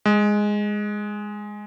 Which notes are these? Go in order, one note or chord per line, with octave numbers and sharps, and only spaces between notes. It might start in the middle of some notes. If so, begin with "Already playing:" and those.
G#3